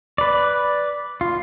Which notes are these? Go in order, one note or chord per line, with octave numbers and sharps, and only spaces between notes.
B4 D5
F4